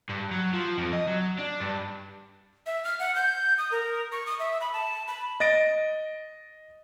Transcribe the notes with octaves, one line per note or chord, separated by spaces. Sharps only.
G2
F#3
F3
F2
D#5
F#3
D4
G2
E5
F6
F#5
G6
D#6
A#4
C#6
D#6
E5
B5
A5
B5
D#5 A6 A#6 D7